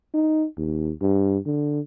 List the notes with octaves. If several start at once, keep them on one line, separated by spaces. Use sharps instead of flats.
D#4
D#2
G2
D3